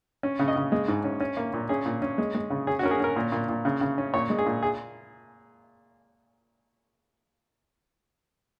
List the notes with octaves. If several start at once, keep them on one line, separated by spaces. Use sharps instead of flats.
C#4
C#3
D#5
C#3
G#3
G#2
C#4
C#4
A#3
A#2
C#4 G#4
A#2
C#4
G#3
G#3
C#3
C#4 G#4
F#4
C#4 A#4
G#4
C#4 A#4
A#2
A#2
A#2
C#3
C#3
C#4
A#2 C#5
G#3
G#4
A#2
G#4